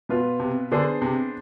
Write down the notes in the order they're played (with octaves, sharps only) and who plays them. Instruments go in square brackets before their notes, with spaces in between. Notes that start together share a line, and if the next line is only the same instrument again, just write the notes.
[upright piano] B2 B3 F4 B4
[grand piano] C3
[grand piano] D3 [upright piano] B3 D4 G#4 C5
[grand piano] C3